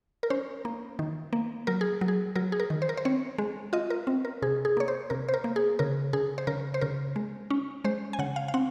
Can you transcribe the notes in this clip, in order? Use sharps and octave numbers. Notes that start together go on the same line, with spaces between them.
A#4
C#4 C5
A#3
D#3
A#3
F#3 A#4
G#4
F#3
G#4
F#3 A#4
G#4
A#4
D#3
C5
A#4
C5
C4 C#5
G#3
F4 D#5
A#4
C4
A#4
C3 G#4
G#4
A#3 C#5
C5
C3 A#4
C5
A#4
A#3
G#4
C#3 A#4
C#3 G#4
C5
C#3 A#4
C5
C#3 A#4
G#3
C#4
G#3 C5
G#5
C#3 F#5
F5
F5
C4 F#5